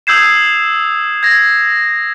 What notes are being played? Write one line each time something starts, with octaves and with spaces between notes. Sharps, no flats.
D#6 E6 G6 G#6 C7 E7
G#6 A#6